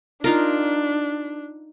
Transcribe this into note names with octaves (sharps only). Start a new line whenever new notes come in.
D4 D#4 F4 A#4